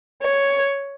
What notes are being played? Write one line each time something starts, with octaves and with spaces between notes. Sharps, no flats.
C#5